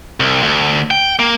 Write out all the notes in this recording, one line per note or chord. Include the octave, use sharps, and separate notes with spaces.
C2
D2
G5
A#3